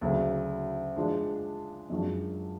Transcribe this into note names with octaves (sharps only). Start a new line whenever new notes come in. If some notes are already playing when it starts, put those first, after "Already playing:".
D2 C#3 F#3
F3 G#3 D4
F#2 F3 G#3 D4 F#4